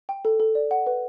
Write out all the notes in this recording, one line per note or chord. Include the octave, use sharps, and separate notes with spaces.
G5
A4
A4
D5
F#5
B4